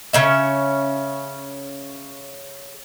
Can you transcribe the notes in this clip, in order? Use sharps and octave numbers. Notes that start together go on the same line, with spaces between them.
C#3 C#4 E5